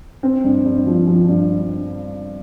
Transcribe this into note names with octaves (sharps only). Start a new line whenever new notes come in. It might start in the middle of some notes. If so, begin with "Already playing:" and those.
C4
G2
G2
F3
F3
G2